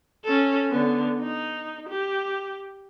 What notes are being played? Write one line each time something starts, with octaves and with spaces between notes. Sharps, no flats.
C#4 A4
D3 B3
D#4
G4